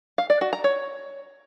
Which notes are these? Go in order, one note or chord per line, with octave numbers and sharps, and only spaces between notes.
F5
D5
F#4
A#5
C#5